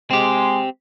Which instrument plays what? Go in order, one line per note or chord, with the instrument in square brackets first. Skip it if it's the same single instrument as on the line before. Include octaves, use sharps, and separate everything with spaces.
[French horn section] G#3 [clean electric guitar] C4 G4